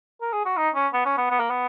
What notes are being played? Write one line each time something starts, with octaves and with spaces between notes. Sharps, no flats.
A#4
G#4
F#4
D#4
C#4
B3
C#4
B3
B3
A#3
B3